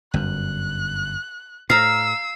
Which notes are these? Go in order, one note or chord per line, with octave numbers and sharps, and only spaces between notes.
G1 F#2 F#6
A2 F5 A#5 E6 C7